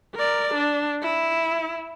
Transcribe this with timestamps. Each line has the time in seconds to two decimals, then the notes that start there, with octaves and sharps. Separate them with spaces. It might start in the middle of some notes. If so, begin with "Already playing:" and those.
0.15 A#4 D5
0.54 D4
1.02 E4